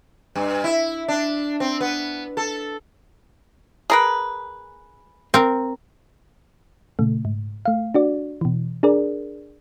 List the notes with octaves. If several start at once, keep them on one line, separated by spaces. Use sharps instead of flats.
G2
E4
D4
C4
B3
A4
G#4 A#4 B4
C4 A#4
A#2 C#3 A3
G#2
A3 F5
D4 F#4 D5
B2 E3
D4 G#4 A#4 D5